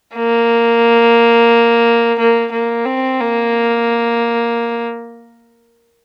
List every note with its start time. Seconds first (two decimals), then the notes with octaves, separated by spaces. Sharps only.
0.15 A#3
2.19 A#3
2.52 A#3
2.85 C4
3.20 A#3